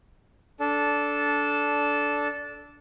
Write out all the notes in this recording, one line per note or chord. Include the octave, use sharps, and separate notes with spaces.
D4 A4